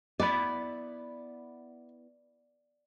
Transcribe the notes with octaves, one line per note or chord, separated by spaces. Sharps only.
B3 E4 D5 B5